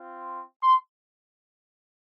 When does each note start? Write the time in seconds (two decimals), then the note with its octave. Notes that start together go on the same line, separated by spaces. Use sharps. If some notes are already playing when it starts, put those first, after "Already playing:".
Already playing: C4 F4
0.63 C6